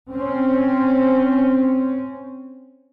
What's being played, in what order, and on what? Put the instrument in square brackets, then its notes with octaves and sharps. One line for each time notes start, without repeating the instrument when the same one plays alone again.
[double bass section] C4 C#4